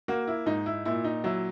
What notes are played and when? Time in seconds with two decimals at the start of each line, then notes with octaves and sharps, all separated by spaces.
0.08 A#3 F#4
0.27 E4
0.46 G#2 D#4
0.66 E4
0.85 A#2 E4
1.04 D#4
1.24 F#3 E4